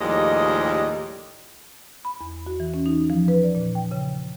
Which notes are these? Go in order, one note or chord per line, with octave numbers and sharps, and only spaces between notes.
D#2 A2 F3 G3 G#3 D#5
B5
E2
F#4
E3
C#4
D#4
F3
B4
D5
A#2
G5
C#3